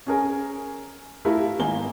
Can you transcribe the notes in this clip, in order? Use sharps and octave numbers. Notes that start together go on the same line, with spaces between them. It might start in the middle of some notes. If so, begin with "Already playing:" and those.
C#4 G#4 A#4 G#5
A3 E4 F4 G4 A#4
G#1 A#3 G#5 G7